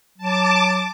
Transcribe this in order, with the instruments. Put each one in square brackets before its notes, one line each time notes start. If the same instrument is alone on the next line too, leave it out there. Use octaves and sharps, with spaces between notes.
[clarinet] F#3 [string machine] A5 D6